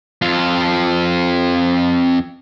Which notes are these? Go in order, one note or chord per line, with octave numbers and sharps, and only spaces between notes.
F2 F4